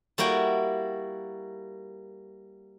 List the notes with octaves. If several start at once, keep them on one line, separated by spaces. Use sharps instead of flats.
G3 A#3 E4 F#4 G5